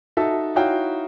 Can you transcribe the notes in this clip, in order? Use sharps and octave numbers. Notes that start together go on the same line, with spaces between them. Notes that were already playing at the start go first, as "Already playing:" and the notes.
D#4 F#4 A4 E5 A5
D#4 E4 F#4 C#5 F5 G5